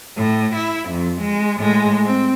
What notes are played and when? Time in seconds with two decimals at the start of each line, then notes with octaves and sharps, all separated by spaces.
0.16 A2
0.56 E4
0.90 F2
1.21 G#3
1.58 A2 G#3
2.05 C4